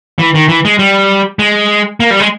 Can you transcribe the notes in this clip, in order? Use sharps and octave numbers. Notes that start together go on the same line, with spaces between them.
E3
D#3
E3
G#3
G3
G#3
A#3
G3
G#3